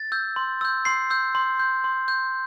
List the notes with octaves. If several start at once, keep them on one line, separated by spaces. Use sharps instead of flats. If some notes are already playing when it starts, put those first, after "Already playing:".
Already playing: A6
E6 G6
C6
E6 G6
C6 C7
E6 G6
C6
G6
C6
G6